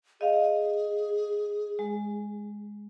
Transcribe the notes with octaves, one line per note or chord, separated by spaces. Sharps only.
G#4 D#5 F5
G#3